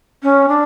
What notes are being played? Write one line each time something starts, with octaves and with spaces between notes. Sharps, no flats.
C#4
D4